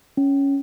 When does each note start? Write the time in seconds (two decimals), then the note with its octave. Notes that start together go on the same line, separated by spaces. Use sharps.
0.17 C#4